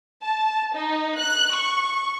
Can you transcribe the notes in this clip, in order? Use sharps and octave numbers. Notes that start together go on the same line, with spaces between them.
A5
D#4
F#6
C#6